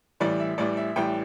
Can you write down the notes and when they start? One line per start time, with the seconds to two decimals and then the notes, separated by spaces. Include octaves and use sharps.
0.20 A1 A2 E3 G3 D5
0.40 E5
0.58 A1 A2 E3 G3 D5
0.77 E5
0.96 A1 A2 E3 G3 G5